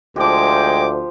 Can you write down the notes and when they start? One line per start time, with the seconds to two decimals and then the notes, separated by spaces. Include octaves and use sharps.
0.16 D2 F3 G#3 G4 G5 D6